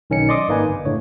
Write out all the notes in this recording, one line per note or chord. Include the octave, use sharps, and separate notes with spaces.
B1 D#3 C#4 D#4 C#7
D5 D#5 C6 D6 D#6
G#1 D#3 A#3 D#4 B4 G#5
G1
A2 D3 C#5